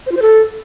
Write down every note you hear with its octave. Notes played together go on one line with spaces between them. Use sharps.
C5
F4
C5
A4